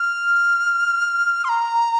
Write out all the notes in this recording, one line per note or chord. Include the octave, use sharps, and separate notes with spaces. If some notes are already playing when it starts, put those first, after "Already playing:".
Already playing: F6
C6
A#5